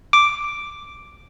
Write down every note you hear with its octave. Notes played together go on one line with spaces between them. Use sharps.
D6